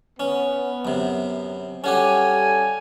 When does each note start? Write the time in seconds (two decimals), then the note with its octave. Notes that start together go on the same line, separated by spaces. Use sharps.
0.20 B3 C#4
0.85 F#2 C3
1.84 G3 C#4 F#4 G4 A4 G#5